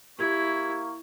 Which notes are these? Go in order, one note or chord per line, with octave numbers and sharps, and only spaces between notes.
A#3 E4 G4 C#6 G#6